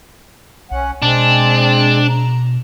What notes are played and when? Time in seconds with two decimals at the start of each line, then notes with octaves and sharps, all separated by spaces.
0.71 B1 C#4 F#5
1.02 B2 G#3 C4 D4
2.10 A#5